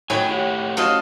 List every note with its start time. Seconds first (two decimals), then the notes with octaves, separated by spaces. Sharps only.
0.10 A2 D#3 F#4 C#5 G5 G#5 B5
0.29 E4 G4 F#5
0.77 C#4 F#4 A4 C5 D#5 F5